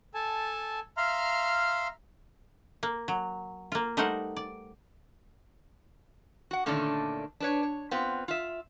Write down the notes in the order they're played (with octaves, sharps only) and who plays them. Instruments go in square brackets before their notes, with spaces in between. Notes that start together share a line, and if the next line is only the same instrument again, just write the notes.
[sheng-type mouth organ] A4 G#5 A5
E5 F5 A#5 C6 F6
[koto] A#3
F#3
A#3 F4
G3 A3 D#4 A#4 C5 F#5
D5
[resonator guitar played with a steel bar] F#4 F#5
A#2 D3 D#3 A3 C#4 D4
D4 B4 C#5
C#5
B3 C4 F4 B4
F4 E5